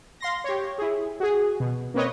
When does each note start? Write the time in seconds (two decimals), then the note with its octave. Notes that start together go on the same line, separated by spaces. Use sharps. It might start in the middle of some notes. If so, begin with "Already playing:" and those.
0.20 F5 C6 A#6
0.44 G4 C#5
0.78 E4 G#4
1.20 F#4 G#4
1.60 B2
1.94 A#3 C4 B4 C#5 D#5